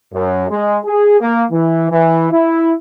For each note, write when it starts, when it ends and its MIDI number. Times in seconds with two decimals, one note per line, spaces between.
0.13 0.46 42
0.50 0.78 56
0.85 1.20 68
1.20 1.44 58
1.51 1.87 52
1.91 2.28 52
2.31 2.73 64